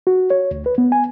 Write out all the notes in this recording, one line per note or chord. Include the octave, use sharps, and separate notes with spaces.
F#4
C#5
D2
B4
B3
G#5